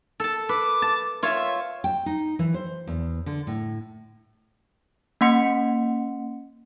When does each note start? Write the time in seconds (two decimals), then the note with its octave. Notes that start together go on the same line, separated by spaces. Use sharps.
0.20 A4 A5
0.49 B4 D6
0.82 A5
1.23 F4 C#5 E5
1.84 G5
2.06 D#4
2.39 E3
2.54 C5
2.87 E2
3.26 D3
3.47 A2
5.21 A#3 C#4 F#5 C6 B6 C#7